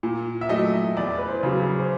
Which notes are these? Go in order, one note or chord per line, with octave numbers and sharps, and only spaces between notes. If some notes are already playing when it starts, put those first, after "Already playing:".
A#2
E5
F#3 A3 D#5
E2 D5
B4
C5
C#3 F#3
G#4
C5